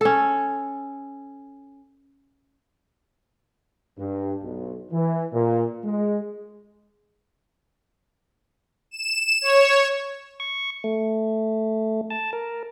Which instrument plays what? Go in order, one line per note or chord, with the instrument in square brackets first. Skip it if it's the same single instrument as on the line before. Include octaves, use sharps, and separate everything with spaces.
[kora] C#4 A4
[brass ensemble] G2
B1
E3
A#2
G#3
[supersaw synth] E7
C#5
[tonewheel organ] C#6
A3
A5
A#4